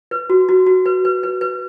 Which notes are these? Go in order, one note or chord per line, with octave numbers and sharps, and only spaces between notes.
B4
F#4
F#4
F#4
B4
B4
B4
B4